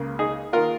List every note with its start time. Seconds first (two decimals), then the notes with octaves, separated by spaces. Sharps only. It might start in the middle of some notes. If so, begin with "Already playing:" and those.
Already playing: C#2 C#3 A#3
0.19 D#4 G#4
0.53 D#3 A#3 F4 A#4